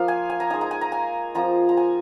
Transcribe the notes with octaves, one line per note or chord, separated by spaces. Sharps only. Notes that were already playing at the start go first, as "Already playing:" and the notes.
Already playing: F3 A#3 F4 F5
G#5
G#5
A#5
G#3 D#4 G#5
A#5
G#5
A#5
G#5
F3 C4 F4 A#5
A#5
G#5